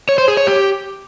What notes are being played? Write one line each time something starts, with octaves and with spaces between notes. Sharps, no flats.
C#5
C5
G#4
C#5
G4